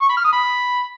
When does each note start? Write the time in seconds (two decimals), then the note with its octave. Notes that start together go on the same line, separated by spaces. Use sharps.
0.02 C#6
0.09 B5
0.17 F6
0.25 D#6
0.33 B5